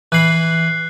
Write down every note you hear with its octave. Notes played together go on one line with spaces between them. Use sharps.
E3 B5 F#6 C7